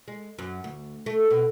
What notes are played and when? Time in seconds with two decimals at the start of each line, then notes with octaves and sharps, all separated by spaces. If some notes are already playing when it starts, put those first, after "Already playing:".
0.08 G#3
0.39 F#2
0.64 D2
1.06 A3
1.30 B2